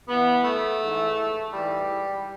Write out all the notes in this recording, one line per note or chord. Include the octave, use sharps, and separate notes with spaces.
G2 E3 B3
A3
G#2 E3
G#2 E3 G3